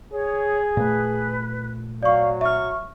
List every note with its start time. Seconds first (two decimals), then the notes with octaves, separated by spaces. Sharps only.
0.12 G#4 C#5
0.77 A#2 A3 B4
2.03 F#3 D5 F5 C#6
2.41 E5 C#6 F6